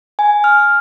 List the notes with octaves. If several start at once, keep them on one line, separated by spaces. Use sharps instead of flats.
G#5
F6